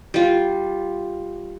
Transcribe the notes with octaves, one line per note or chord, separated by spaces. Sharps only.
G3 F4